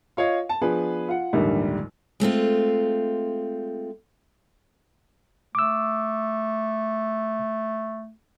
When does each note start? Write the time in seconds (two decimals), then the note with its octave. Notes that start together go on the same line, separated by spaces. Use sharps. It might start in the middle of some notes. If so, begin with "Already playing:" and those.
0.17 F4 C#5 D#5 F5
0.49 A5
0.61 F3 B3 D4 G#4 B4
1.09 F4 F#5
1.33 A#1 D#2 G#2 D3 D#3 G3
2.20 G#3 A3 C4 F4
5.55 A3 D6 E6